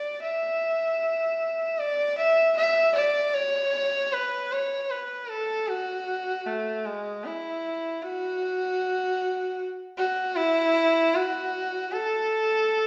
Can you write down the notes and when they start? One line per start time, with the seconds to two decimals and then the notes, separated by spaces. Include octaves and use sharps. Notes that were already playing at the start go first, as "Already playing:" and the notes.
Already playing: D5
0.22 E5
1.79 D5
2.18 E5
2.57 E5
2.95 D5
3.34 C#5
4.12 B4
4.52 C#5
4.90 B4
5.29 A4
5.68 F#4
6.46 A3
6.85 G#3
7.25 E4
8.02 F#4
9.97 F#4
10.36 E4
11.15 F#4
11.92 A4